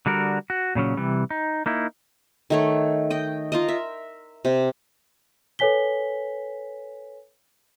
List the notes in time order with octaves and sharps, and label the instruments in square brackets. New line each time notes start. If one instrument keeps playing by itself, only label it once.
[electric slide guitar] D3 G3 F#4 A#4
F#4
A#2 C#3 F#3 C#4
C3 E3 G3
D#4
A#3 D#4 E4
[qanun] D#3 A3 C#5
D#5 G5
F4 A#4 D#5
E5
C3
[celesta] A4 B4 C#5 G#5 B6 G7